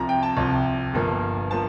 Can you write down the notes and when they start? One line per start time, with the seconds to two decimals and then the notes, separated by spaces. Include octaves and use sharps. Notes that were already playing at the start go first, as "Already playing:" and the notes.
Already playing: C2 C3 F3 A#5
0.09 G5
0.23 A5
0.37 C2 C3 F3
0.94 G1 G2 F3 A#3
1.51 F3 A#3 A5